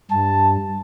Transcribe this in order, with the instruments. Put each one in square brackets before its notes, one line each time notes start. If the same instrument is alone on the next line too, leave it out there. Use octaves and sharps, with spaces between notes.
[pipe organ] G2 [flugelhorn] A5